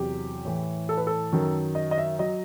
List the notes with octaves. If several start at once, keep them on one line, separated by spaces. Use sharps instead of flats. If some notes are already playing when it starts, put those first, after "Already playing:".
Already playing: E2 C3 F#3 G4
A2 E3
A4
B4
A4
F#2 D#3 F#3
D#5
D#5
E5
F#3 D#5